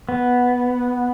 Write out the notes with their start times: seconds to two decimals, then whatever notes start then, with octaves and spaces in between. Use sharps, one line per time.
0.09 B3